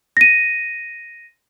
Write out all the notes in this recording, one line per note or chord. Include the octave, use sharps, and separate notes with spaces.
A#6 D#7